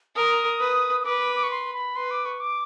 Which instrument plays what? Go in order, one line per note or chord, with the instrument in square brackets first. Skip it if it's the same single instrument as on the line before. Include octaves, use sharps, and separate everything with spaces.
[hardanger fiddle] A#4 [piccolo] D#6
[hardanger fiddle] B4
[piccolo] D#6
[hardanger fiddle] B4 [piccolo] D6
[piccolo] D6
C#6
C6
B5
[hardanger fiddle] B4 [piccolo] C6
[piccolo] D6
C#6
D6